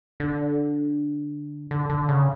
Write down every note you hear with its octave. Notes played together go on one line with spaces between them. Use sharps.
D3
D3
D3
C#3